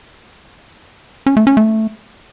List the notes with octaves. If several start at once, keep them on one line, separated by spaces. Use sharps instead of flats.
C#4
A3
C#4
A3